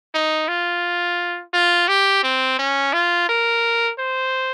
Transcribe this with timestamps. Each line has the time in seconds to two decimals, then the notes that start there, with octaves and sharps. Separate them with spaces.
0.14 D#4
0.48 F4
1.54 F4
1.88 G4
2.23 C4
2.59 C#4
2.93 F4
3.29 A#4
3.99 C5